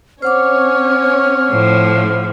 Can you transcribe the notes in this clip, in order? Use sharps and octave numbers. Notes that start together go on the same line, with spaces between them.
C4 C#4 C5 C#5 F#5 D6 F6
A2 F3